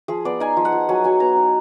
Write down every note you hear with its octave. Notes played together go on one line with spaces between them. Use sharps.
F3 G#4
B3 D5
D#4 G#5
F3
F#5
F3
F#3 G#5
F#3 G#5
B3 A#5
D#4